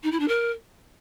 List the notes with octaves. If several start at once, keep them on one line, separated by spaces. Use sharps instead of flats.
D#4
E4
D4
A#4